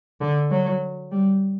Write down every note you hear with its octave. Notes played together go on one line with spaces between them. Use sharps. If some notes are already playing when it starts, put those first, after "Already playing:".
D3
F#3
G3